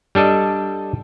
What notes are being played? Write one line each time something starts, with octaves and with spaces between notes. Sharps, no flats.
G3 D4 A4 D#5